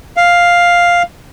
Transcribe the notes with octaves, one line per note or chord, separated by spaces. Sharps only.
F5